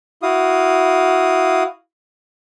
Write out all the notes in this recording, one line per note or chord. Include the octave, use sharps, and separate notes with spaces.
E4 F#4 F5 D#6